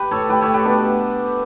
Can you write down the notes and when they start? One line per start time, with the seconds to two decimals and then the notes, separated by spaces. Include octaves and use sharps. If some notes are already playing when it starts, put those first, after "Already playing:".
Already playing: G4 B4
0.11 A2 A4 C#5
0.29 A2 G4 B4
0.41 A4 C#5
0.47 A2
0.54 G4 B4
0.65 B2 B3 D4